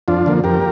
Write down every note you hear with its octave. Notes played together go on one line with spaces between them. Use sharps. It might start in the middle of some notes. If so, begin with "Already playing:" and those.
F2 D4 F4
D3 F3 A#3
F2 G4 A#4